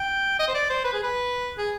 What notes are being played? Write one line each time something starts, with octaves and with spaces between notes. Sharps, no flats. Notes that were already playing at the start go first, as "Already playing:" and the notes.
Already playing: G5
D#5
C5
D5
C5
B4
G#4
B4
G#4